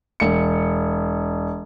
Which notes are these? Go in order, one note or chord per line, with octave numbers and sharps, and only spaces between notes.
E1 C#7